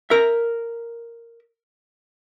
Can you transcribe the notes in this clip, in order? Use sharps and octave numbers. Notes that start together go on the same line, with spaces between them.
A#4 E5